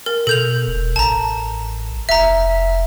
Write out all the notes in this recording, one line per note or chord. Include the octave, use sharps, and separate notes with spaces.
A#4
B2 A4 G6 F7
E1
A1 A5 A#5
F1 E5 A#5